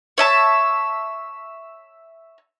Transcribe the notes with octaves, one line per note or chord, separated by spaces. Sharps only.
C#5 E5 A5